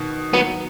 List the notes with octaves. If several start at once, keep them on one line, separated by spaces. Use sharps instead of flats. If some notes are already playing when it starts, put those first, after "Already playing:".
Already playing: B2 D#3
D#3 F#3 B3